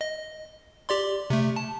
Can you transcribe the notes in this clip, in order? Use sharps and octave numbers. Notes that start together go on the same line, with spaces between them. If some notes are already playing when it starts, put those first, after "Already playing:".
D#5
G4 D5 C6
C3 A3
A5